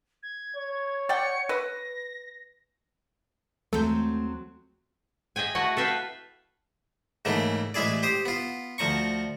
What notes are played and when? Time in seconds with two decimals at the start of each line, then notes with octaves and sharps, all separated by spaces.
0.23 G#6
0.57 C#5
1.09 D5 F#5 G5 C#7
1.49 B4 A#6
3.73 D#2 F#3 G#3 A3 C4 A4 G6
5.36 G#4 D#5 E5 G5 G#5
5.55 A3 E4 F#4 D#5 F#5
5.77 A4 B4 E5 F5 G5
7.25 G#2 C#3 E3 A3 A#3
7.74 A1 G#3 E4 G#4 D5
8.03 G4 C5 D#6
8.26 B3 F4
8.78 D2 F3 A#5 C#6